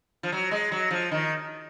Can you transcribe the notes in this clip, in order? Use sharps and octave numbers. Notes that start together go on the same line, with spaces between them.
F3
F#3
G#3
F#3
F3
D#3